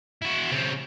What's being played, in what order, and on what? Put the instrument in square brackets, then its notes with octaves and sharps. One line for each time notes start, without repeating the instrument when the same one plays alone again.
[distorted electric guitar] E4 F#4
C#3 C4